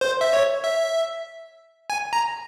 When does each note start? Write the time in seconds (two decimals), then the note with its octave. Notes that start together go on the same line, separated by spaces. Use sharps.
0.01 C5
0.21 E5
0.33 C#5
0.64 E5
1.90 G#5
2.13 A#5